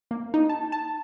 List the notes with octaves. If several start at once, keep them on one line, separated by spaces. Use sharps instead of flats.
A#3
D#4
A5
A5